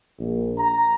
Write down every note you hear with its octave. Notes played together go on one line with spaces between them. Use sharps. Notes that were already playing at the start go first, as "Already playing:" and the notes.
A#1
A#5